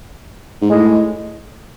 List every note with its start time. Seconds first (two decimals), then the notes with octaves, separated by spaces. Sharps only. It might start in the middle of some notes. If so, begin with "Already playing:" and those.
0.61 G#2
0.70 A2 G#3